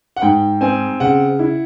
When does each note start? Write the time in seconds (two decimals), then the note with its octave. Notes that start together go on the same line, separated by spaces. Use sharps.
0.16 F#5
0.22 G#2 G5
0.61 C4 G#5
1.00 C#3 F#5
1.39 E4